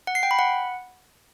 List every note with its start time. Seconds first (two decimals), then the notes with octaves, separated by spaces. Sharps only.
0.07 F#5
0.15 C7
0.23 G5
0.31 B5
0.39 F#5